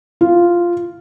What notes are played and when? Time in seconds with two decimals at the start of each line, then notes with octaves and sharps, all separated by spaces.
0.21 F4